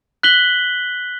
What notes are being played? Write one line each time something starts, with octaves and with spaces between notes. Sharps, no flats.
F#6 B6 F#7 G7